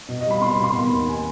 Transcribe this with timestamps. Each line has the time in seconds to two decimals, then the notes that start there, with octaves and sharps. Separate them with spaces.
0.09 B2
0.21 D#5
0.26 G3 B5
0.42 B2 C6
0.53 B5
0.59 B2 C6
0.70 C6
0.75 D#3 B5
0.92 D#2
1.09 G#5